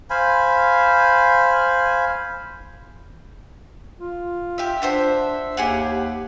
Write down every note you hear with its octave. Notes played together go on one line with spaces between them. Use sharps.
C5 F5 G#5 B5
F4
G4 E5
D4 C5 E5 F#5
D#2 G4 G#4 F#5